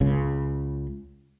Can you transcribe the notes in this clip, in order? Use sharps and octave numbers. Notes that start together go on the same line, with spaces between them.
C#2 C#3